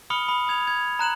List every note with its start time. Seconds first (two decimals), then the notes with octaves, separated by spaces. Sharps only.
0.10 B5 D#6 F6 C#7 G7
0.28 B5 D#6
0.47 B5 D#6 G#6 F7
0.68 G#6
0.99 A#5 F#6 E7 F#7